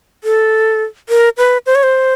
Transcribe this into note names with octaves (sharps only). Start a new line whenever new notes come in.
A4
A#4
B4
C5
C#5
C5